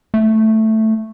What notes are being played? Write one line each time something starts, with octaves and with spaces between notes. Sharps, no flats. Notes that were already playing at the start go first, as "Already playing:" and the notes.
A3